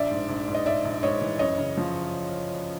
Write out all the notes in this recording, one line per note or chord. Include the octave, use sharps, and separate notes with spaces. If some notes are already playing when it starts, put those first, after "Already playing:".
Already playing: A#1 D5 E5
G#2
A#1
G#2
D#5
G#2 D5 E5
A#1
G#2 C#5 D#5
E3
F#2 C#5 D#5
C#3
F3